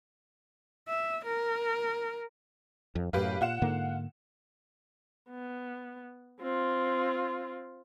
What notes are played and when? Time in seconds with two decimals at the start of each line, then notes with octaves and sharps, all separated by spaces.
0.88 E5
1.25 A#4
2.95 F2
3.13 F#2 A2 G4 B4 F5
3.41 A#2 F4 F#5 E7
3.62 G#2 D3 A#3
5.30 B3
6.40 C4 F4